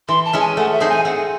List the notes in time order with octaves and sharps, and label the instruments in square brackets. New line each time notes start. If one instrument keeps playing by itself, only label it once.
[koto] E3 [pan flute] C6
[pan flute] A5
[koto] G#3 C#4 E4
[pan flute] G#5
[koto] A3 [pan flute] F#5
[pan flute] E5
[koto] C4 D#4 G#4 C5
[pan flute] G#5
[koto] C4 [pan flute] F#5